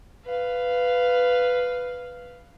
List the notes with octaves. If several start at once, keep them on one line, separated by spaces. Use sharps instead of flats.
B4 F5